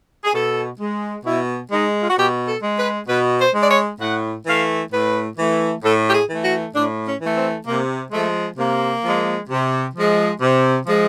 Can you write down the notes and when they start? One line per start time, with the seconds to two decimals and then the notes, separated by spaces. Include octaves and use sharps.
0.25 G#4
0.34 B2 A4
0.80 G#3
1.25 B2 E4
1.72 G#3 D#4
2.02 F4
2.10 F#4
2.17 B2 G4
2.48 A4
2.63 G#3
2.79 B4
3.09 B2 B4
3.40 C5
3.55 G#3
3.62 D5
3.70 C#5
4.01 A2 F#5
4.46 E3 A3 F5
4.92 A2 B4
5.38 E3 A3
5.83 A2 A4
6.09 G4
6.14 G#4
6.30 E3 A3
6.44 F#4
6.75 A2 D4
7.06 C#4
7.21 E3 A3
7.37 C4
7.67 C3 A#3
8.12 F3 G#3 A3
8.58 C3 A#3
9.04 F3 G#3
9.50 C3
9.95 F3 G#3
10.42 C3
10.87 F3 G#3